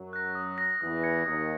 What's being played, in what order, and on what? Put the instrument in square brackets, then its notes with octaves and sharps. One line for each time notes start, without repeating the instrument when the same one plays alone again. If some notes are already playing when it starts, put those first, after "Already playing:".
Already playing: [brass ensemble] F#2 F#3
[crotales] F#6 A#6
D#6
F#6 A#6
[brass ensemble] E2 E3 [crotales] D#6
[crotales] G#6 C#7
[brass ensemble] D#2 D#3 [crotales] D#6